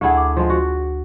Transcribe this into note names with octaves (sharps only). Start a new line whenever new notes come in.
D2 A3 E4 G#4 F#5
D6
F3 G#3
F#4